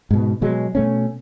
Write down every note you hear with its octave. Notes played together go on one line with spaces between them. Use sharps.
G#2 B2
B2 F#3 G#3
B2 A3 C#4